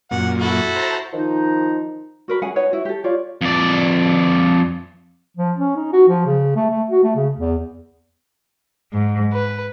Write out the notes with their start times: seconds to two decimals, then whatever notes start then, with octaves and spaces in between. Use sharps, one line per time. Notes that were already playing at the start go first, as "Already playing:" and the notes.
0.11 F#2 A#2 F#5
0.40 E4 F#4 A4
0.76 C5 A5 A#5
1.13 D#3 F3 D#4
2.28 F#4 A#4 B4
2.42 C#4 G#4 F#5 G#5
2.56 D#4 B4 C#5 F#5
2.71 E4 F#4
2.85 G4 A4
3.04 F4 C#5 D5
3.41 F2 D5
5.37 F3
5.57 C#4
5.76 D#4
5.93 F#4
6.09 F3
6.26 C#3
6.56 A3
6.70 A3
6.91 F#4
7.04 A3
7.16 C#3
7.38 E2
8.93 G#2
9.32 B4